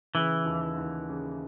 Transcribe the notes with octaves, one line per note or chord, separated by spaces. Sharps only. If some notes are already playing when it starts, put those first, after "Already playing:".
C#3 E3
D#2
D#2
C#3